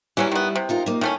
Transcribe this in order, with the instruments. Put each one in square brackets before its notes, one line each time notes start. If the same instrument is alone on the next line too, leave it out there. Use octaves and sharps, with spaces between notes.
[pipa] E3 F#3 C#4 [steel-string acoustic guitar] G3 E4
[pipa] D#3 B3
C3
[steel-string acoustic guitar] D#4 F4 A#4
A#3 D#4
[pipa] D#3 A3 C#4 [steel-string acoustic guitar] E4